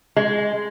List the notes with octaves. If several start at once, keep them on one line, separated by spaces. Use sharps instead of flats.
G#3